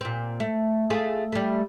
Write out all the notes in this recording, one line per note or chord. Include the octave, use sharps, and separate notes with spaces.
A#2 C4
A3
A3 F4 G#4
G3 A3